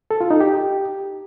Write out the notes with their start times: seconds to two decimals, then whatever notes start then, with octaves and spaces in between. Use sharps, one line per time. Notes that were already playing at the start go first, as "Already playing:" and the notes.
0.11 A4
0.21 F4
0.31 D#4
0.41 G4